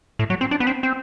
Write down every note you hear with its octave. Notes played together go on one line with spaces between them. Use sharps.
A2
F#3
C4
D4
B3
C4
C4